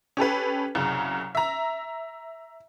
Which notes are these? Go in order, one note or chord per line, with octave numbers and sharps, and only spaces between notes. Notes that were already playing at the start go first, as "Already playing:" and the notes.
C#4 G4 A4 B4
C2 F#2 C#3
E5 A#5